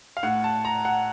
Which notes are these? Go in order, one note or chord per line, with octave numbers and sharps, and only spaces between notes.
F5
A2 F#5
A5
A#5
F#5